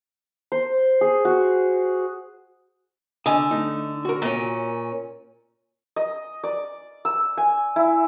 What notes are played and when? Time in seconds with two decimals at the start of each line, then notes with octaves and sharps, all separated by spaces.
0.52 C5
1.01 G#4
1.25 F#4
3.26 D3 D#5 G#5
3.51 A3 D#4
4.05 F#4 A#4
4.22 A#2 C#4
5.96 D#5
6.44 D5
7.05 E6
7.37 G#5
7.76 E4